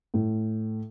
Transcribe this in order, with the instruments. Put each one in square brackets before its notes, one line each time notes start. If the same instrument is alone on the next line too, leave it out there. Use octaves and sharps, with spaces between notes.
[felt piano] A2